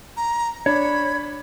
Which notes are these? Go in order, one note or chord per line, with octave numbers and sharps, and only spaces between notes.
A#5
D4 C#5 B5